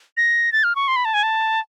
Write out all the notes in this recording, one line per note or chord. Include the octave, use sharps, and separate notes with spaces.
A#6
A6
F6
C#6
C6
B5
A5
G#5
A5